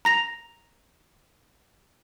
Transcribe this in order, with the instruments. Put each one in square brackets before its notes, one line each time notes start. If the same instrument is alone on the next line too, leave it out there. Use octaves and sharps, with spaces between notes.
[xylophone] A#5 A#6 F7